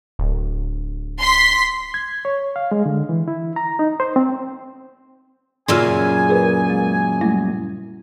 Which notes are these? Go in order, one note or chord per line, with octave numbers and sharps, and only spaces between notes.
D1
C6 B6
G#6
C#5
F5
G#3
D3
E3
E4
A#5
D#4
C5
C4
F#2 A#2 C#3 G#5 C6 E6 F6
G#4 A#4 B4
G#3
G3 A3 E4